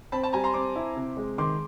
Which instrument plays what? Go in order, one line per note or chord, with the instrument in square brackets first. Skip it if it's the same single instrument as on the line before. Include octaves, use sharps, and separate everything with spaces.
[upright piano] C4 [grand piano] A5 B5
[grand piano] A5 B5
[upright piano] G3 [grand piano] G#5 A#5
[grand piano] A#5 C6
[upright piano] C4 [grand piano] C6 D6
[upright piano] E4
C3
G#3
[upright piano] D#3 [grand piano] C6 D6